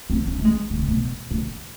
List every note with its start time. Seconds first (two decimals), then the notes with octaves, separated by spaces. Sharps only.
0.10 C4
0.27 C#4
0.38 A3
0.45 G#3
0.70 C#3
0.79 C3
0.88 B2
1.31 A#2